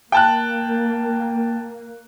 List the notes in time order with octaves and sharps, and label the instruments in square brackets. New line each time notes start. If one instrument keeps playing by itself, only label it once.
[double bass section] A#3 [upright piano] G5 A5 F#6